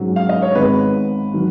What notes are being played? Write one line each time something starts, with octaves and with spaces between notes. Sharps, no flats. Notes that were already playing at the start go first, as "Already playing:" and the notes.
Already playing: G#2 F#3 C#4
F5
D#5
C#5
G#1 G#2 D#3 G#3 B3 B4
D#3 F#3